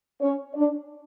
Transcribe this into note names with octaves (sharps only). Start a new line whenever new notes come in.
C#4 C#5
D4 D5